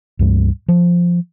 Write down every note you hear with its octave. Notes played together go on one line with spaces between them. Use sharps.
C#2 G2 G3
F3